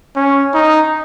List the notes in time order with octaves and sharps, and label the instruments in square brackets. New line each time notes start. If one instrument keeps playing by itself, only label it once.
[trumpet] C#4
D#4